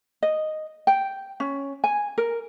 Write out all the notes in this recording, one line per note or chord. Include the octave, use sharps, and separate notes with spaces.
D#5
G5
C#4
G#5
A#4